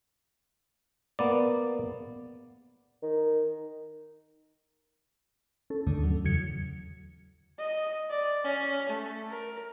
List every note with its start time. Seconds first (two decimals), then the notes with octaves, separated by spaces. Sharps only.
1.19 A#3 B3 D5
3.02 D#3
5.70 C#4 A4
5.87 D#2 G#2 D3 A3
6.03 F#3
6.25 E2 C#3 F#3 G#6 C#7
7.59 D#5
8.10 D5
8.44 C#4
8.89 A3
9.30 A#4